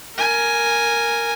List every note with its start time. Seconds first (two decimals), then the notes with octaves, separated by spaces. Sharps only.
0.17 A#4 G#5